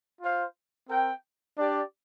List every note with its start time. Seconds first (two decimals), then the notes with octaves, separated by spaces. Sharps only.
0.21 F4 C5 F5
0.89 C4 A#4 G5
1.58 D4 G4 D5